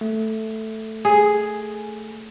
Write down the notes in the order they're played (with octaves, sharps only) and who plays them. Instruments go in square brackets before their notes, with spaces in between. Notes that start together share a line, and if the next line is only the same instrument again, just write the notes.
[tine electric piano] A3
[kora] G#4